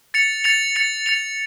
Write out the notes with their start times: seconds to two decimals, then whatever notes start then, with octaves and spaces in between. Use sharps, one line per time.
0.14 A6 C#7 F7
0.44 A6 C#7 F7
0.76 A6 C#7 F7
1.06 A6 C#7 F7